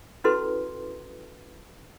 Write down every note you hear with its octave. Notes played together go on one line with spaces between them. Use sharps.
C#4 E4 F#4 A4 B4 C6